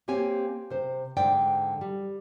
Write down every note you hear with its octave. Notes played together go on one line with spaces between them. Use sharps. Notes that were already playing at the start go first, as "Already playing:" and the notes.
A#3 C4 G4 C#5 G#5
C3 C5
G#2 D3 D5 G5
G3